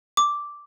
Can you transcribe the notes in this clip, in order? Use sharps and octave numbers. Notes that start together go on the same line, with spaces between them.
D6